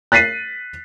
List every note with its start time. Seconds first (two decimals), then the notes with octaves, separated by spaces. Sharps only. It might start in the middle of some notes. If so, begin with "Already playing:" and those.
0.12 F#6 A6 B6 C7 D#7